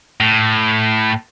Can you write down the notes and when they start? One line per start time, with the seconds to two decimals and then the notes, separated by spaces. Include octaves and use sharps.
0.20 A2